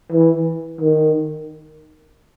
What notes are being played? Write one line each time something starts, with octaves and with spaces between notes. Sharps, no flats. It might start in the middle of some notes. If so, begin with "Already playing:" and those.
E3
D#3